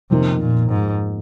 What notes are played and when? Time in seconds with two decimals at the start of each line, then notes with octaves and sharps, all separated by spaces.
0.10 F2 C3 D#3 A#3 D#4
0.41 A#2
0.70 G#2